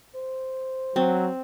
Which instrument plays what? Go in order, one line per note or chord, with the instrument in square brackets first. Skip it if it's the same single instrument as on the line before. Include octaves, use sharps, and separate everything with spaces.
[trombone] C5
[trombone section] F#3 [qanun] C4